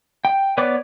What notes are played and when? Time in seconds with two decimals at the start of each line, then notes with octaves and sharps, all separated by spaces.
0.25 G5
0.58 B3 B4 C#5 D5 D6